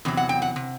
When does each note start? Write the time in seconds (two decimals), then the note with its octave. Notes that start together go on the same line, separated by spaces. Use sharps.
0.05 E2 C3 F#3
0.17 F#5
0.29 G5
0.42 F#5
0.56 C3